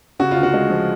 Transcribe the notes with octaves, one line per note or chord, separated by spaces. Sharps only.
C#3 F#4
F4
D2
F#4
G#3
F3